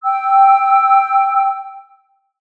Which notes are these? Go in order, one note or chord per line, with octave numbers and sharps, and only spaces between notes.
G5 E6